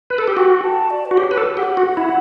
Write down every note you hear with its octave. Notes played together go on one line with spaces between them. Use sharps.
B4
A4
G4
F#4 G5
A5
D5
B4
F#4
G4 C#5
B4
A4
G4 F#5
F#4
E4